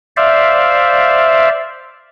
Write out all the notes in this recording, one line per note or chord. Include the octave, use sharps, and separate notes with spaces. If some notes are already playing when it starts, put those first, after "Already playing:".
C5 D5 E5 F5